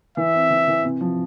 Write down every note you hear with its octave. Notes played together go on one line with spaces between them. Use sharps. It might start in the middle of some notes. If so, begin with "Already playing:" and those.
E3 E5
C4
E3
E3
C3
F3